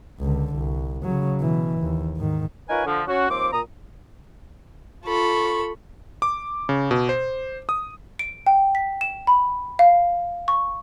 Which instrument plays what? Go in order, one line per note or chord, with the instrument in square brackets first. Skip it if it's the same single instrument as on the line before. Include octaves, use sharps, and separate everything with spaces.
[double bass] C#2 D3
C2
C#3 F#3
B2 E3
D#2
G#2 D#3
[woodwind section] D#4 F4 A#4 B4 C#5 G#5
D3 F3
C#4 F#4
D#2 F3 C4 D6
A#2 A#5 D#6
[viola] F4 C#6 [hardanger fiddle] A4 B5
[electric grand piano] D6
C#3
B2
C5
D#6
[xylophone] D7
G5
B6
E7
B5
F5
C#6